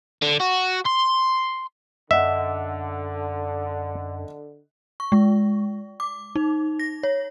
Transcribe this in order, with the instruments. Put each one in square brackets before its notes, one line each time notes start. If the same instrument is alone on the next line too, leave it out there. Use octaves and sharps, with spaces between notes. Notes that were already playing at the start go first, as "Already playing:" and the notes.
[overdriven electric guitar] D3
F#4
C6
[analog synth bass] F#2 [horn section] D3 [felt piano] D#5 F#5 [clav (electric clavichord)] E5
[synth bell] C#6
G#3
D6
D#4
A#6
C#5